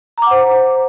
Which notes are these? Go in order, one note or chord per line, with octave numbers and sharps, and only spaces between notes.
C5 F#5 A#5 D6